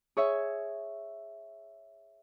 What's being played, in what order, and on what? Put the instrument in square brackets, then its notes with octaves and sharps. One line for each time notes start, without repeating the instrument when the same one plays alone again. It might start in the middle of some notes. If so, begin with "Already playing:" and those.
[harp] G#4 C#5 E5